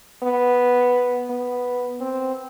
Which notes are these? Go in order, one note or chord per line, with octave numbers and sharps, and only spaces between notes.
B3
B3
C4